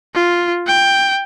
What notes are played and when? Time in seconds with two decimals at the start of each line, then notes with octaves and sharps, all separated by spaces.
0.15 F4
0.67 G5